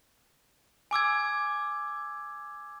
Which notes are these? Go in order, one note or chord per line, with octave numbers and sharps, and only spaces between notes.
G#5 D6 E6 G#6